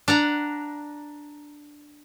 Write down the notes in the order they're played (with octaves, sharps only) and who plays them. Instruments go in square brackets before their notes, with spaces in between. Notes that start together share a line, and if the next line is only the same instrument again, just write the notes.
[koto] D4 F#5 A#5